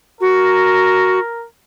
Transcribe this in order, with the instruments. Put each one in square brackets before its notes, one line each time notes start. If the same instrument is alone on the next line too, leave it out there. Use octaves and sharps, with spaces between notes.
[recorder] F#4 [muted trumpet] A#4